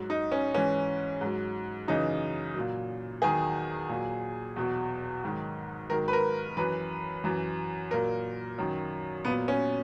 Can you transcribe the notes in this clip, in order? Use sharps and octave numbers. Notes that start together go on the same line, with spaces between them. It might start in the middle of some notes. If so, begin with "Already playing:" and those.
Already playing: G#2 F#3
D#4
C#4
G#2 E3 C#4
G#2 F#3
F#2 C#3 E3 D#4
A#2 F#3
E2 D#3 F#3 G#4
A#2 F#3
E2 B2 F#3
G#2 D#3 F#3
G#2 D#3 F#3 A#4
B4
A#4
F#2 E3 B4
F#2 E3
A#2 F#3 A#4
F#2 D#3 F#3
A#2 F#3 B3
C#4